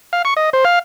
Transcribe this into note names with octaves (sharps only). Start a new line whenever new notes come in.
F5
C#6
D#5
C5
F5